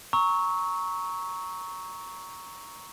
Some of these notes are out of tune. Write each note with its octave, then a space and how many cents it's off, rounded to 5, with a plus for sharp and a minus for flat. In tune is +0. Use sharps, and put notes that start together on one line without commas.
A#5 +0 C#6 +0 E6 -25